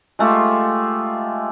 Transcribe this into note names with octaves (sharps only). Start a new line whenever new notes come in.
G#3 A3 F4 G4